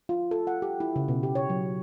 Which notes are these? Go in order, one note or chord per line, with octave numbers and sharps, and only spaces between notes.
F4
A4
F#5
G4
E4
C#3
B2
G4
C#5
F#3